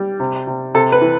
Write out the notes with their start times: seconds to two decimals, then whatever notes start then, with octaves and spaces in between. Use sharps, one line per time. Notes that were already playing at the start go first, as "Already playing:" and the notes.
Already playing: G3
0.20 C3
0.47 C3
0.75 C3 A4
0.92 B4
1.01 E3